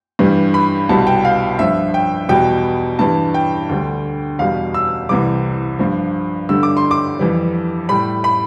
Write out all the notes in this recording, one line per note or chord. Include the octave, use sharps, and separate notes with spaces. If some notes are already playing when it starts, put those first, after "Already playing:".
G2 E3 G3
B5
C2 B2 G3 A5
G5
F5
G2 F3 E5
G5
E2 B2 G3 G5
G2 E3 G3 A5
G5
D2 D3 G3
E2 B2 G3 F5
E6
C2 C3 E3 G3 D6
G2 F3
G2 D3 G3 E6
D6
C6
D6
F2 E3 G3
A2 G3 B5
B5